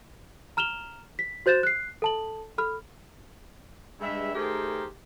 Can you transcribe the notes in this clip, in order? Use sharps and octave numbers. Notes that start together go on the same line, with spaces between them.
A#5 F6 E7 F7 G7
B6
F#4 C5 G6 A6 E7
F#6 C7
A4 A5 F#7
A4 B5 F6
G2 G#3 E5
D#3 A3 G4 G#4 A#4 C5